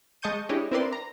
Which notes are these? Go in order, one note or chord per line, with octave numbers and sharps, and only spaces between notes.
G#3 D#5 A5 C#6 G6 D#7
D4 E4 G4 G#4 C#5 D#5
C4 E4 A#4 B4 D5 C6
A#5